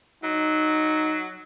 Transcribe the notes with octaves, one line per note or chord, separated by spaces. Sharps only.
F#3 D#4